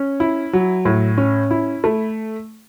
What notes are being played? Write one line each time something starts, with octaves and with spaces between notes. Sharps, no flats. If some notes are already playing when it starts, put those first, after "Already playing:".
Already playing: C#4
E4
F#3
A2
C#4
E4
A3